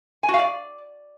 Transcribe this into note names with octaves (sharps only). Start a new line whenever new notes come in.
G#5
F#4
F5
D5